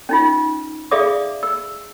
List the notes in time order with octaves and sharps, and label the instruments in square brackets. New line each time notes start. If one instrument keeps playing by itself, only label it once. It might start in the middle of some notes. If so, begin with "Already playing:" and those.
[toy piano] C#4 D#4 F4
G#4 D5 E5 F5 D6 D#6
E6